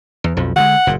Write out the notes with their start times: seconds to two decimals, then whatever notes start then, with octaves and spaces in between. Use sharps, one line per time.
0.24 E2
0.37 B1 F2 F3
0.56 D3 E3 G#3 F#5
0.87 F#1 A#2